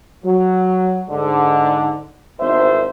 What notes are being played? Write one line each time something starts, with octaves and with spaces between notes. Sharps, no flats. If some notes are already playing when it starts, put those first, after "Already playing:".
F#3
G#2 D3
G#1 E2 C5 E5